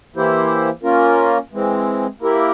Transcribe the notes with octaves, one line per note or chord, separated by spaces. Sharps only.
E3 A#3 E4 G4 C5
A#3 C#4 F4 A#4
E3 G#3 C4
A#3 E4 G4 A#4